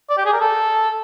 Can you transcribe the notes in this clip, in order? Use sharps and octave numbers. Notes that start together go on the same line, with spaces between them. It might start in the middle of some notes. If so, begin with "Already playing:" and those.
D5
G4
G#4
A#4
A4